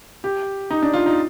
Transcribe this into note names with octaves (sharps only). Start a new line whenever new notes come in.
G4
D#4
D4
F4
D#4